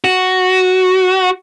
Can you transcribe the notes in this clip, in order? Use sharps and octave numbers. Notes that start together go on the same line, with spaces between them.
F#4